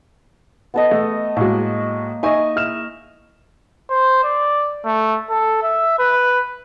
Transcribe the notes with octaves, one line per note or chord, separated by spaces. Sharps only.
B3 A4 D#5
A3
A2 G#3 A#3 F#4
D#4 D#5 E5 G#5 C#6
E4 F6 E7
C5
D5
A3
A4
E5
B4